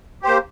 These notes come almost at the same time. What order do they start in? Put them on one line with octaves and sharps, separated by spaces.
G4 C5 A#3